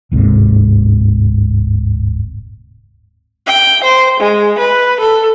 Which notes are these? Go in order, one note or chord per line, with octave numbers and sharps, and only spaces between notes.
D1 G1 G#2 C3
G5
C5
G#3
B4
A4